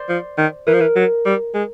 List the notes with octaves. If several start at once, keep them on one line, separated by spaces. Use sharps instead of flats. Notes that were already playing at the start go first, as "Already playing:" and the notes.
Already playing: C5 D5
F3
D#3
E3 A#4
F3
E3
F#3
G3
G#3